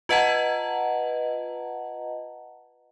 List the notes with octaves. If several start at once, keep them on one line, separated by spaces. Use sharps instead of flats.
F4 B4 D#5 F#5 A5 A#5